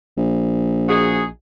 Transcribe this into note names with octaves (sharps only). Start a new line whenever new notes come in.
A#1
D#4 F#4 G#4